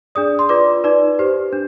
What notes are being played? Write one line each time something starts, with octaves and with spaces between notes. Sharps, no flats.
D4 G#4 D5 D#6
C6
F4 B4 D5 D6
D#4 B4 D5
G4 C5
D4